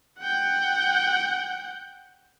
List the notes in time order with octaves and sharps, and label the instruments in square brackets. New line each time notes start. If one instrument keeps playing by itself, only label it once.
[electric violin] F#5 G5